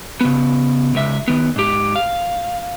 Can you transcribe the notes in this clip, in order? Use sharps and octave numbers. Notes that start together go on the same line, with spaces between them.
C#3 B3
C#2 E5
D#3 B3
G#2 G4
F5